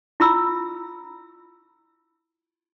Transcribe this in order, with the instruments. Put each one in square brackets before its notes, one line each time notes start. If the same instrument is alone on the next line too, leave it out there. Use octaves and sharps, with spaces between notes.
[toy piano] E4 F4 B5 E6